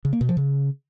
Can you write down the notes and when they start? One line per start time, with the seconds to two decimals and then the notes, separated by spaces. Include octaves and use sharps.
0.05 C#3
0.13 A#3
0.21 B2
0.29 F3
0.37 C#3